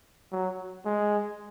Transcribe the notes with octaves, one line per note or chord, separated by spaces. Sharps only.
F#3
G#3